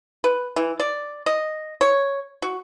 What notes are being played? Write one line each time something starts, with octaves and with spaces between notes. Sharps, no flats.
B4
E3
D5
D#5
C#5
F#4